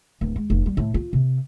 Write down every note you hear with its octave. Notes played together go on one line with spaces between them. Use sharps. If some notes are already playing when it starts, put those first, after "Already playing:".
D1
G#3
F1
G3
A2
F4
C3